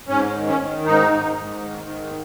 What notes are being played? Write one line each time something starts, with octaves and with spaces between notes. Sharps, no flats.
G#2 C#4
D#3
C#4
D#3
G#2 D#4
G#2
G#2
D#3
G#2